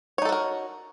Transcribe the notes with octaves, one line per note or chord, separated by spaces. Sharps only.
D#4 F#4 A4 A#4 C#5